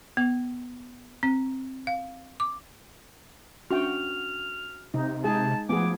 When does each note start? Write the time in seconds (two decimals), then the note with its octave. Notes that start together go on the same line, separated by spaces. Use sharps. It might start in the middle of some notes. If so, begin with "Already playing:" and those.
0.17 B3
1.23 C4
1.87 F5
2.40 D6
3.71 C#4 D4 F#4 E5 G5 F6
4.94 C3 D#4
5.24 G#3 D#4 G#4 A5
5.69 F3 A3 B3 G#4 D6